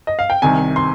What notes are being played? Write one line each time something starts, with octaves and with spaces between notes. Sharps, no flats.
D#5
F5
G5
C2 C3 D#3 G#5
C6